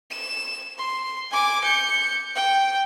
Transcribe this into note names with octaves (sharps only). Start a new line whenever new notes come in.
E7
C6
G#5 D6
G6 C#7
G5